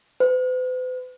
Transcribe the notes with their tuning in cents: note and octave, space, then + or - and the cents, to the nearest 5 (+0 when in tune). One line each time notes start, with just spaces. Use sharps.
B4 +45